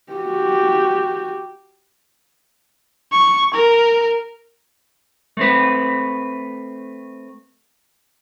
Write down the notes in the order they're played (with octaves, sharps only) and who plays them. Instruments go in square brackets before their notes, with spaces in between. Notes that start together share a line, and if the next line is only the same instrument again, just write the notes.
[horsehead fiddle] F#4 G4
[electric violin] C#6
A#4
[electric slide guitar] A3 C4 B4